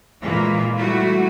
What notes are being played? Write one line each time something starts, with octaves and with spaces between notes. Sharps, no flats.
A#2 E3 G#3 A#3 F4
G3 A3 E4 F#4